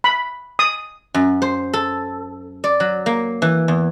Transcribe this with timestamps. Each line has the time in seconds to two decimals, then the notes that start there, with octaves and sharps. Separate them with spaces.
0.04 B5
0.59 D#6
1.14 F#2
1.42 C5
1.73 A4
2.64 D5
2.80 F#3
3.06 A#3
3.42 E3
3.68 E2